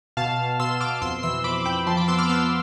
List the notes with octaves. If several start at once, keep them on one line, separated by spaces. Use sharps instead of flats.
B2 F5 A5
B2
B2 C6 E6
B2 D6 F6
F2 C6 E6
E3 C6 E6
F2 B5 D6
F2 G5 B5
F3 A5 C6
B5 D6
B3 C6 E6
D6 F6
B3 C6 E6